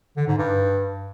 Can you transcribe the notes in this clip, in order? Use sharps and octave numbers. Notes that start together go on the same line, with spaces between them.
D3
G#2
G2